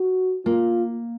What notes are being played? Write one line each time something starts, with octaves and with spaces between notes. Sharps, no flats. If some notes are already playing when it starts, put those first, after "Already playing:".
Already playing: F#4
A#3 F4